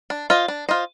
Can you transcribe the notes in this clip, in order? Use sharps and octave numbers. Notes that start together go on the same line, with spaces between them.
D4
F4 C5 D#5
D4
F4 C5 D#5